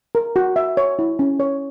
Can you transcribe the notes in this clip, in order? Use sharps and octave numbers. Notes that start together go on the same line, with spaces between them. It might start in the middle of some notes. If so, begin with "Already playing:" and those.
A#4
F#4
E5
C#5
E4
C#4
C#5